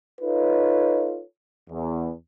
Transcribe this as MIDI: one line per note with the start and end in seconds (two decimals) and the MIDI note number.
0.22 1.23 63
0.22 1.23 65
0.22 1.23 69
0.22 1.23 71
0.22 1.23 73
1.70 2.12 40